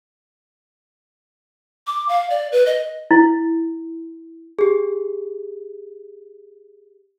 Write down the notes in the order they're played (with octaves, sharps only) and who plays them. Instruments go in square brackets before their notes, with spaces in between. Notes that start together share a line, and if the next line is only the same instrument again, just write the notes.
[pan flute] D6
F5
D5
B4
D#5
[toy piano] E4
[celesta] G4 G#4